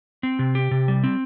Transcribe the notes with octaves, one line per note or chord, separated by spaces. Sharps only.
C4
C3
G4
C3
G3
C4